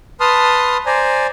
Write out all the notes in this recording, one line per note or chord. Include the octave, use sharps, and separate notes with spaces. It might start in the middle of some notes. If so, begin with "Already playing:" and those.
B4 A5 C6 D#6 F6
C5 D5 G#5 A#5